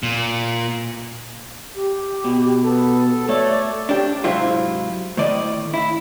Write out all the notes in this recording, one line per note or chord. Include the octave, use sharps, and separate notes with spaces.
A#2
G4
B2
B3 A4
A3 C#5 D5 E5
D4 G4
G#2 C3 F#3 C4 E4 F4
A2 D#3 D5 D#5
E4